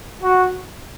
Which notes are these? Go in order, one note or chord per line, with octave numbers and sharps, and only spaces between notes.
F#4